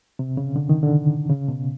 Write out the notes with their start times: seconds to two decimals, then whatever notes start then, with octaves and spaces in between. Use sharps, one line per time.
0.19 C3
0.37 C#3
0.56 D3
0.69 D#3
0.83 D3
1.30 C#3
1.48 B2